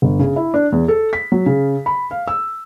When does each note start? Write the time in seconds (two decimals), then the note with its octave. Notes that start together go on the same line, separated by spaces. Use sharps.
0.02 G1
0.19 C#3
0.36 E4
0.54 D4
0.72 E2
0.88 A4
1.13 B6
1.32 F#3
1.46 C#3
1.86 B5
2.11 F5
2.28 E6